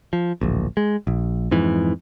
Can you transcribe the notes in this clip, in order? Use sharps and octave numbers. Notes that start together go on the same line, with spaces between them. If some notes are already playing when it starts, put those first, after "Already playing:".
F3
D1 A#1
G#3
A#1
F2 G#2 E3